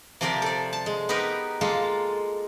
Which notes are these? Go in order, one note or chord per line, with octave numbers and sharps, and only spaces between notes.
C3 F3 C4 G4 A#4 D5
A4 D5
A5
G#3
B3 D#4 G4 A#4 B4
G#3 A#3 F4 A4